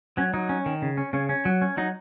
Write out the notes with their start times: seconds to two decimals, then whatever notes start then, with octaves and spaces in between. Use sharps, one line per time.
0.17 F#3 C#4
0.34 F#3 D#4
0.49 C#4
0.66 D#3
0.82 C#3
0.97 C#4
1.13 C#3 C#4
1.29 C#4
1.45 F#3
1.62 C#4
1.77 F#3 D#4